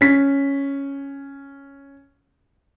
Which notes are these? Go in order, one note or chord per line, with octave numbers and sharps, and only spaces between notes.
C#4 B6